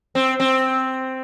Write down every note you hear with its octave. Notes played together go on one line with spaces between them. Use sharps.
C4
C4